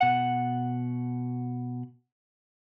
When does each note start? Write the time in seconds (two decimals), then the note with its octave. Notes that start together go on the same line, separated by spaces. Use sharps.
0.01 B2 F#5